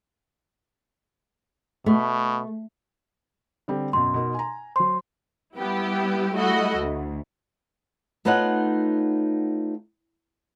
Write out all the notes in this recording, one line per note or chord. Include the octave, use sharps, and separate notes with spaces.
B2 A3
D3 G3 C4
F#2 B2 C6
B2 D#4 A#4
G#5 A#5
F#3 C5 C6
G3 B3 E4 G4
G3 A3 E4 F#4 D#5
D2
A3 B3 D#4 F4 C#5 F#5